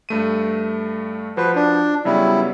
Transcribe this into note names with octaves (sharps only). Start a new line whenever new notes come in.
G2 A3 D#7
F3 F#4 B4 C5
D4
C#3 F#3 G3 B3 E4